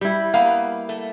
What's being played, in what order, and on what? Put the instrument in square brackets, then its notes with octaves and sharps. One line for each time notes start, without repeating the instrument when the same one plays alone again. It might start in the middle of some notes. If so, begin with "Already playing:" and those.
[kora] G3 E4
[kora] A#3 [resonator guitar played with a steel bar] B3 F5
[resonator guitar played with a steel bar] A3